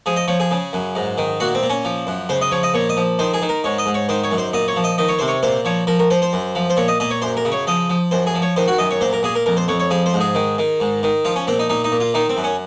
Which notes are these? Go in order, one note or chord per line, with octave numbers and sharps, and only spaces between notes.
F3 G#4
D#5
F3 C#5
G#4
C#3
F#2
G#2
D#3
A#2 F#4
C4
A#2
C#4
F3
F#2
C#3 C5
D#5
F3 C#5
D#5
A#2 C#5
D#5
F3
D#3 C5
G#4
D#3
A#4
G#2 C#5
D#5
G#2
C#5
D#3 C5
C#5
F#2
C5
A#2 D#5
C#5
F3
D#5
D#3 D#5
C#5
C3 C5
C#5
A#2 C5
F3 C#5
F3 A#4
A#4
F3 C5
C5
F#2
F3
C5
A#2 C#5
D#5
A#2 D#5
C#5
F#2 C5
A#4
C#3
C#5
F3 D#5
F3
F#2 C5
G#4
F3
C#5
D#3 C5
F#4
F#2 D#5
C#5
A#2 C5
A#4
A#2 G#4
A#4
F2 A#4
C5
F2 C#5
C#5
F3 G#4
C5
G#2
G#4
D#3
D#3
G#2
D#3
F3 F4
C#4
A#2 C4
D#4
A#2 D#4
D#4
A#2
F4
D#3 D#4
C4
F#2
C#4